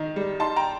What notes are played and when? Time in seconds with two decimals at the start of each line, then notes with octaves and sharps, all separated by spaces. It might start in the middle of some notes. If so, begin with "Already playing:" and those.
Already playing: D#3 D#4
0.16 G3
0.40 D#4 A5 C6
0.56 G5 A#5